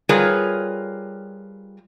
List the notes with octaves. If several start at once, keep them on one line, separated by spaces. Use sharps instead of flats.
G3 F4 G#4 A#4 B4 C#5